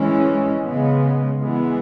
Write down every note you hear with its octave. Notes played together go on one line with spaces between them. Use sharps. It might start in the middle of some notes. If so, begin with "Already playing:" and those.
Already playing: E3 G#3 C#4
C#3 G#3 B3
E3 G#3 B3